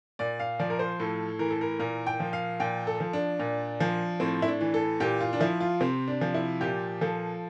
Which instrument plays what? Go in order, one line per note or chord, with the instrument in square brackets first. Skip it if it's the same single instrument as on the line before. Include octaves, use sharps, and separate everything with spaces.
[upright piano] A#2 D5
F5
F3 D5
A#4
C5
A2 A4
E3 A#4
A4
A#4
A#2 A#4
G5
F3
F5
A#2 G5
A4
F3
D4
A#2
F3
A2 C4
E4
D4
E3
A4
A#2 G4
F4
D4
F3 E4
F4
C3 C4
D4
F3
E4
A#2 G4
F3 A4